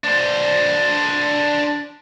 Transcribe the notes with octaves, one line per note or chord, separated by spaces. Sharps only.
D4 C5